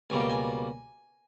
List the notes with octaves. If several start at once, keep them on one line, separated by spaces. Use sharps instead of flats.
C#2 B2 G3 A#3 G#5
G5
G#5